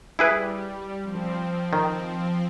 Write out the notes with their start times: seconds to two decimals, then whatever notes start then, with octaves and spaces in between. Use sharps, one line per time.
0.19 G3 E4 G#4 B4
1.02 F3 C4
1.73 D#3